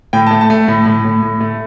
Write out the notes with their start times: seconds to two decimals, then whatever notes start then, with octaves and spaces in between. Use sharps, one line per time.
0.13 A2 G5
0.27 A5
0.31 A3
0.41 A5
0.50 A3
0.68 A2
0.86 A2
1.05 A2
1.23 A2
1.40 A3